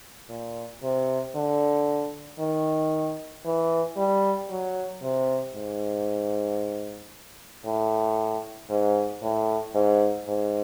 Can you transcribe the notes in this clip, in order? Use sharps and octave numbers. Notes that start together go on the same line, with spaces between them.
A#2
C3
D3
D#3
E3
G3
F#3
C3
G#2
A2
G#2
A2
G#2
G#2